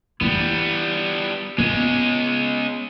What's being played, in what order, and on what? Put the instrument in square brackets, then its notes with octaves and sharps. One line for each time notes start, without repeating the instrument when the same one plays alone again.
[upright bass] E3 E4 [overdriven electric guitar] G3 B3
[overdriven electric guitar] G#3 C#4 [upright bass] B3